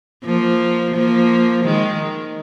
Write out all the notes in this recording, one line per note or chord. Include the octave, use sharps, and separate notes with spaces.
F3 A#3
F3 A#3
D#3 G#3